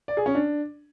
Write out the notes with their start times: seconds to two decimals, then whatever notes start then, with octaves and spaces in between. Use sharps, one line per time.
0.08 D5
0.17 G#4
0.26 C#4
0.35 D4